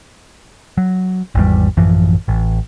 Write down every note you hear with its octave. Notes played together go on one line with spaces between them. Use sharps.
F#3
G#1 E2 G3
A1 F#2 E3 F3
A1